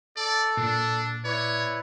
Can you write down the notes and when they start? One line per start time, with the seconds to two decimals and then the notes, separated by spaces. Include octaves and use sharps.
0.16 A4 D5
0.57 A#2 D4
1.24 E4 B4 C#5 D5